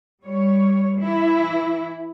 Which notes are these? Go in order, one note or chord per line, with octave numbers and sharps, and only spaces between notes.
G3 C#5
E3 E4